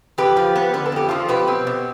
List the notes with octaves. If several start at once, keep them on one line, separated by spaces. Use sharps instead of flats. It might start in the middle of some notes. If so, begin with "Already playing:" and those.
F2 G4 B4
F3
B3
D3 B4
A4
F2 G4
F3 F4 A4
B2 G4 B4
C4
B2